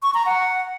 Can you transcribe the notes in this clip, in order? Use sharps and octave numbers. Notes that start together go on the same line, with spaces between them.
C#6
A#5
F#5